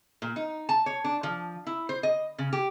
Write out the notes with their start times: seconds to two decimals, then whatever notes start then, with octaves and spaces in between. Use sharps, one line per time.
0.22 A#2
0.36 D#4
0.69 A5
0.86 C#5
1.04 D4
1.23 F3
1.67 E4
1.89 C5
2.03 D#5
2.38 C#3
2.53 G4